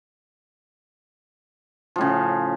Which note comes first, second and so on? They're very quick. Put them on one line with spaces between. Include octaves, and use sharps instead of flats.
F3 A2 C#3